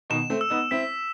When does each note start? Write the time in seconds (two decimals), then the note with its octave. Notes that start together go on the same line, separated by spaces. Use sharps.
0.10 B2 D#3 E7
0.30 A3 C4
0.41 E6
0.50 B3 D#4
0.71 C4 E4 B6